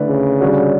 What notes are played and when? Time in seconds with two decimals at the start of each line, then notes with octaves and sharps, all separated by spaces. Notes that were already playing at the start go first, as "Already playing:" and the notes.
Already playing: D3 A3 E4 B4 D5
0.08 C#3
0.41 D3 G3 D4 F#4 C#5